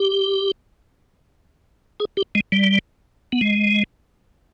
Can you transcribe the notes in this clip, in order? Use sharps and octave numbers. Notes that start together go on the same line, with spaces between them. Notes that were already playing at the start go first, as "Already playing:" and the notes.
Already playing: G4
G#4
G4
G#3
G3
B3
G#3